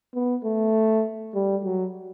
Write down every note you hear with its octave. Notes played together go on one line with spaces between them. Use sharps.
B3
A3
G3
F#3